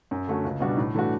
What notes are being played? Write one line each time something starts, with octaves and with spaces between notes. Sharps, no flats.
F#2
D3 A3 C#4 F#4
C#2
B2 G3 D4 F#4
A2
E3 A3 D4 F#4